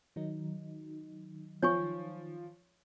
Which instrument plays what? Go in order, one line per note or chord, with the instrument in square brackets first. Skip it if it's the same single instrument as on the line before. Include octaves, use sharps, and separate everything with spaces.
[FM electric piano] D#3 F#3 D#4
[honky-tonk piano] F3 [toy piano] C#5 G#5 C#6